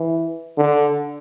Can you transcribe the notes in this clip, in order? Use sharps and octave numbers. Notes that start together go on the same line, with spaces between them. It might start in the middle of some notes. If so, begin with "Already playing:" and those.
Already playing: E3
D3